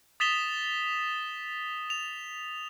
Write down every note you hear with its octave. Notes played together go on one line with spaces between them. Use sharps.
D#6 A6 B6 E7 F7 G7
F7